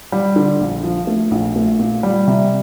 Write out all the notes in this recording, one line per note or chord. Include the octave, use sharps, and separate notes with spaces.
G3
D3
A#1
F3
A3
A#1
A3
A#2
G3
C3